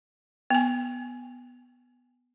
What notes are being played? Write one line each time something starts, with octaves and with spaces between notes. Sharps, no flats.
B3 G#5